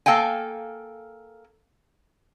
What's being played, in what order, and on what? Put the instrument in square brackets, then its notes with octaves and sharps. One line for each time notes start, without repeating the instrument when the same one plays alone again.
[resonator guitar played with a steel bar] A#3 A4 F5 G5 G#5